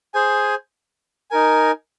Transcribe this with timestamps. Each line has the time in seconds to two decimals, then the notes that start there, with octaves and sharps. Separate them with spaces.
0.14 G#4 C5 G#5
1.31 D#4 A#4 G#5